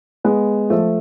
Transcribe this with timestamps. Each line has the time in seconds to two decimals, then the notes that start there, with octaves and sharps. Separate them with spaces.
0.24 G#3 B3
0.70 F3 A3